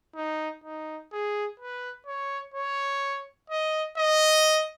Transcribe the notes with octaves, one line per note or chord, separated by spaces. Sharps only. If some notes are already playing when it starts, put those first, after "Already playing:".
D#4
D#4
G#4
B4
C#5
C#5
D#5
D#5